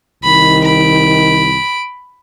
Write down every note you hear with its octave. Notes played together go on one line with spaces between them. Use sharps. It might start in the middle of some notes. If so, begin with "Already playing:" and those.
C2 D#3 B5
B5 D7